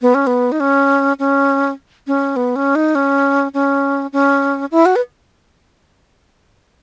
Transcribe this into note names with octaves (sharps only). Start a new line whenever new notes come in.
B3
C#4
B3
D#4
C#4
C#4
C#4
B3
C#4
D#4
C#4
C#4
C#4
E4
F#4
B4